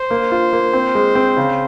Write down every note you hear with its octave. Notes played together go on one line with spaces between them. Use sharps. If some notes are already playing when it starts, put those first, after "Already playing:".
Already playing: C5
A#3
F4
A#3
C4
G#3
C4
C#3